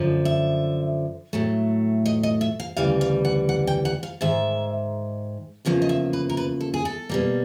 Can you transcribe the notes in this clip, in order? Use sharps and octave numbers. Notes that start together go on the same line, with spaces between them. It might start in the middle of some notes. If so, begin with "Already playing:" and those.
Already playing: F#2 D3 F3
E5
A2 F#3 A3
D#5
D#5
E5
F5
D2 C#3 E3 G3 F5
F5
F#5
F#5
G5
F#5
F5
G#2 D#3 G#3 E5
E2 C#3 F3 A#3 F5
D#5
E5
B4
A#4
B4
A4
G#4
A4
B2 G3 A#3